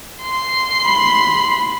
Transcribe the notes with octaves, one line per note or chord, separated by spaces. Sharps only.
C6
B5